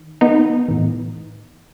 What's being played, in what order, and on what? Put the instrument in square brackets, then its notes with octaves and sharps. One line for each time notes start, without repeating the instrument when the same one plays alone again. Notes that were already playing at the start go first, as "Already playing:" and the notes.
Already playing: [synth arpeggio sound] D#3
B3 D#4
A2 E3